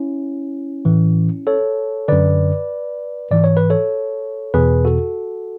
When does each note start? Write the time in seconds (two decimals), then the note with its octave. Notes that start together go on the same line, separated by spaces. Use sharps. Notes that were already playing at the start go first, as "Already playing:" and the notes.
Already playing: C#4 E4
0.85 A2 E3
1.47 A4 C#5
2.08 F#2 D3 B4 D5
3.31 G#2 E3 D5
3.44 C#5
3.57 B4
3.70 A4 C#5
4.54 E2 B2 G#4 B4
4.85 F#4 A4